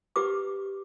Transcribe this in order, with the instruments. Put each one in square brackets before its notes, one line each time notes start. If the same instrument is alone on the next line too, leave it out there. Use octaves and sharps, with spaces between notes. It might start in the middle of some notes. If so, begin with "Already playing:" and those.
[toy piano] G4 B4 D6